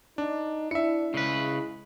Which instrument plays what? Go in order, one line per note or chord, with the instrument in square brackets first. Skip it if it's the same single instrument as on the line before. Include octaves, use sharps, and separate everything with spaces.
[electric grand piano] D4 [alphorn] D#4
[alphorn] D4 [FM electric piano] E4 [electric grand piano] E5 C#7
[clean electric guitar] C#3 B4 [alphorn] G#3